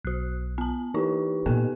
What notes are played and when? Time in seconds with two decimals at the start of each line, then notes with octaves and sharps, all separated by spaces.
0.05 B1 F#4 F#6
0.58 B3 A5
0.94 E3 D#4 E4 G4 B4
1.46 A#2 A#3 B3 A4 G5